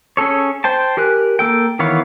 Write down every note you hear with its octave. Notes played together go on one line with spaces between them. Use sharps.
C#4 G#4 A4 C#5
C5 G5 A5
G4 A#4 G#5 F#6
A#3 A4 G5
D#3 E3 B3 C#5 F5